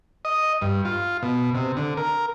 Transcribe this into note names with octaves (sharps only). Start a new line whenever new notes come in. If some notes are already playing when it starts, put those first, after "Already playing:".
D#5
G2
F4
B2
C3
D3
A#4